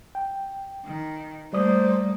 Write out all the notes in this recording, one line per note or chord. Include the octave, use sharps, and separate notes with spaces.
G5
D#3
G3 A3 A#3 C5 D5 D#6